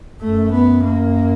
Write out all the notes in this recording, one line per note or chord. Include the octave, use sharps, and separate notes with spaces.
F#2 A3
B3
A#3